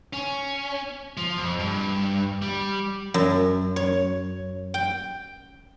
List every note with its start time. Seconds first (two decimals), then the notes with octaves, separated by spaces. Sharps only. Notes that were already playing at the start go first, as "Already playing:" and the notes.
0.13 C#4
1.17 F3
1.38 F2
1.59 G2
2.42 G3
3.14 F#2
3.76 C#5
4.74 G5